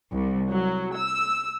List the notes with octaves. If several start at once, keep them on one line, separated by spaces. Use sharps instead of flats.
C2
F#3
E6